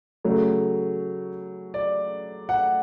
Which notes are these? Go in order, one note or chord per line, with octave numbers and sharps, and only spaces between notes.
C#3 F#3 A3 C#5
D5
F#5